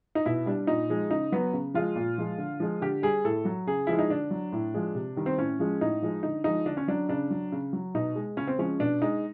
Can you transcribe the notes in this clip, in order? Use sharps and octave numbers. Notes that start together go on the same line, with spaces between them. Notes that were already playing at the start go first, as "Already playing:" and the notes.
D#4
B2 E4
G3 D4
A#2 D#4
F3 G#3
C#3 D#4
F#3 B3
C#3
F3 G#3 F4
A#2
F3 G#3
D3
F3 G#3
D3 G4
G3 G#4
A2 A4
F#3
C#3 G#4
F3 G#3 E4
D#4
D3 D4
F#3
A2
F3 G#3
C3
D#3 G3
C4
A2 C#4
F3 G#3
A2 D#4
F3 G#3
D3 D#4
F3 G#3 D#4
D3 D4
C#4
F#3 D4
C#3 D4
F#3
C#3
F#3
B2 D#4
G#3
C#3 C#4
C4
F3 G#3 C#4
B2 D4
G#3 D#4